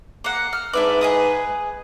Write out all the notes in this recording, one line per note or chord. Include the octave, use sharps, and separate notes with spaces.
A#3 F#5
F6
G#2 D4 E4 B4 D5
G#4 D#5 D#6